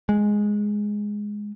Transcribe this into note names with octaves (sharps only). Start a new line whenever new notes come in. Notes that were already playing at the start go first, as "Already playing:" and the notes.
G#3